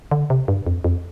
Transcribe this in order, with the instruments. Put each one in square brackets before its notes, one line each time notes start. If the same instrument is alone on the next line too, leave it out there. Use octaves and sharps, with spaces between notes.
[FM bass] D3
C3
G2
F2
F2